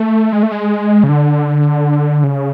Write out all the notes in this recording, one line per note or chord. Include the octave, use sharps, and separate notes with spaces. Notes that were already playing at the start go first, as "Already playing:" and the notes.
Already playing: A3
G#3
A3
G#3
C#3
D3
C#3